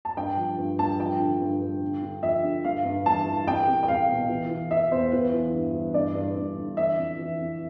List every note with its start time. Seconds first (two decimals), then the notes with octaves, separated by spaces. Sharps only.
0.05 A5
0.17 G2 G5
0.37 F3
0.59 G2
0.79 G2 A5
0.99 F3 G5
1.20 D3
1.41 G2
1.62 G2
1.81 D3
2.02 D3
2.23 F3 E5
2.44 D3
2.64 G2 F5
2.85 G2
3.06 E3 A5
3.26 E3
3.47 C2 G5
3.67 C2
3.83 G5
3.88 C2 F5
4.09 B2
4.29 E3
4.51 E3
4.71 E3 E5
4.92 E2 C5
5.12 E3 B4
5.33 E3
5.54 G2
5.75 E3
5.94 G2 D5
6.15 G2
6.36 G2
6.57 D3
6.77 E3 E5
6.98 F2
7.19 E3
7.39 F2